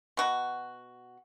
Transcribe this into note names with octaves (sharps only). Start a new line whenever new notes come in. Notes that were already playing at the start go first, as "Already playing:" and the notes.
B2 F#4